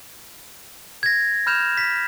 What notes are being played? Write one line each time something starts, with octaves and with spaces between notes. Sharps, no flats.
G#6 A#6
B5 F6 G6 E7 F7
B6